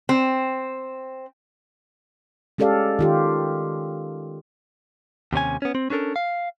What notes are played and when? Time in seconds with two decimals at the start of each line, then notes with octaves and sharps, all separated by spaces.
0.09 C4
2.58 G#3 C#4 G4 A4 D5 F5
2.99 D#3 F4 G4
5.33 D#2 C3 C#4 G#5
5.62 B3 C#4
5.75 C4
5.90 C#4 D4 A4 A#4
6.16 F5